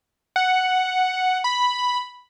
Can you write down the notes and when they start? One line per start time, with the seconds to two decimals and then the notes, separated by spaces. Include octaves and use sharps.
0.36 F#5
1.44 B5